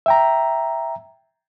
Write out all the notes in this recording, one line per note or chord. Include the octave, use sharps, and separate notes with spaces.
E5 G5 A#5